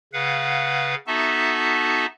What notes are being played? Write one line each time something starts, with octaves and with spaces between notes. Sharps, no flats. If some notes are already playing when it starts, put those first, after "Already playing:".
C#3 B4 F5 F#5
B3 D#4 F#4 A4 E5 A5